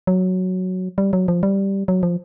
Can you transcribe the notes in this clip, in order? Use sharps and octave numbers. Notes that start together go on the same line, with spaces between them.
F#3
G3
F#3
F3
G3
F#3
F3